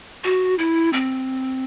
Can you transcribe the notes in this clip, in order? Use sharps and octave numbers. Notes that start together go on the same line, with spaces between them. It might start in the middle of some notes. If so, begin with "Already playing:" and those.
F#4
E4
C4